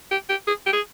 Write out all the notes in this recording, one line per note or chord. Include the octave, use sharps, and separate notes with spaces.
G4
G4
G#4
G4
G#4